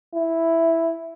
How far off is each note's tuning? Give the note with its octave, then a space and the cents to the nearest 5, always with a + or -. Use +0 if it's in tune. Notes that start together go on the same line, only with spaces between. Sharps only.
E4 +0